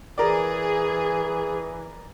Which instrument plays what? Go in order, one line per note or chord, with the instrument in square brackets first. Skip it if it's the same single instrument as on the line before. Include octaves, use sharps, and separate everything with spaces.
[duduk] E3 [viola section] G#4 [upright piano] A#4 D5